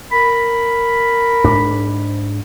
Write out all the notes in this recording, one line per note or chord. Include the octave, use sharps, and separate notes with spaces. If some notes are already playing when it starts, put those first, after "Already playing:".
A#4 B5
G#2 D4